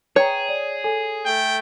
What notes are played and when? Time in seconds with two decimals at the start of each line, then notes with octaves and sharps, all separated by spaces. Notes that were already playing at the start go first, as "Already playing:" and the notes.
0.16 G#4 B4 C#5 G5 A#5
0.49 D5
0.84 A4 G#5
1.25 A3 G5